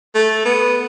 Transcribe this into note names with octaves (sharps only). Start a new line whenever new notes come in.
A3
B3